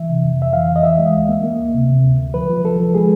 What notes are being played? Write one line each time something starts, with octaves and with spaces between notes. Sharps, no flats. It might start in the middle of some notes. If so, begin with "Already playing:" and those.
Already playing: E3 E5
C3
F2
F2 E5
E3 F5
E3
D#5
E3 E5
G#3
D2
A#3
A#3
D2
C3
C3
D2
D2
F3 B4
F3
F3 A4
F3
G#3 G#4